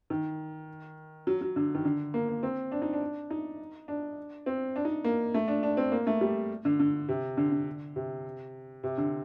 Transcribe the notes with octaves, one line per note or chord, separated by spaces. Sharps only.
D#3
F#3
F#3
D3
D#3
D3
A#3
A#3
C4
D4
D#4
D4
D#4
D4
C4
D4
D#4
A#3
A3
D4
D4
C4
A#3
A3
G3
D3
D3
C3
D3
D3
C3
C3
D3